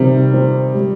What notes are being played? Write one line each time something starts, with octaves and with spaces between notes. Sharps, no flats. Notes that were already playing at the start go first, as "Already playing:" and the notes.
Already playing: C3 D#3 G3
C4
G3